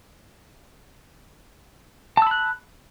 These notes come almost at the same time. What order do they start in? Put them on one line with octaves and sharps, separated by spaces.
A5 E6 B5 F#6